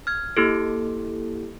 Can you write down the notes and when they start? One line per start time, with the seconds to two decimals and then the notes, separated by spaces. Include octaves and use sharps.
0.07 F6 G#6
0.37 A#3 E4 G4 A4